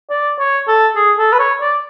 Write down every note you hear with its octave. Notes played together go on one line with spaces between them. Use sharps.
D5
C#5
A4
G#4
A4
B4
C#5
D5